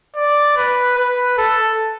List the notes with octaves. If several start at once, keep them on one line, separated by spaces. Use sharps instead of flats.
D5
B4
B4
A4